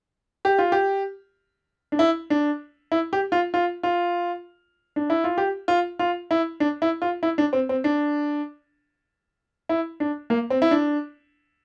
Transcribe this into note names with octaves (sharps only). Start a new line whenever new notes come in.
G4
F4
G4
D4
E4
D4
E4
G4
F4
F4
F4
D4
E4
F4
G4
F4
F4
E4
D4
E4
F4
E4
D4
C4
C4
D4
E4
D4
A#3
C4
E4
D4